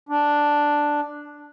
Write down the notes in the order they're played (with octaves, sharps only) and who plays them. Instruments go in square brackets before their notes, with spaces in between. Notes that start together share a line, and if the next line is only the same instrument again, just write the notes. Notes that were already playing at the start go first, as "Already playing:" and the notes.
[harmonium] D4